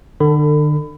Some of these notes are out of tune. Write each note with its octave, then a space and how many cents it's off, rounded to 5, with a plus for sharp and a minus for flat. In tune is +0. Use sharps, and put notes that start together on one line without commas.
D3 +40 A4 +30 B5 +25